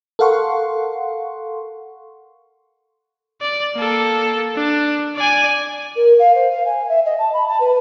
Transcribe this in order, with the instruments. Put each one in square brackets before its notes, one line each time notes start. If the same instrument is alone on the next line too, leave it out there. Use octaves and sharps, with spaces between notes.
[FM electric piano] A4 A#4 F5 F#5 C6 C#6
[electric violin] D5
A#3 A4
D4
D5 G#5
[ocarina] A#4
F5
C5
F5
G#5
E5
D#5
A5
B5
A5
B4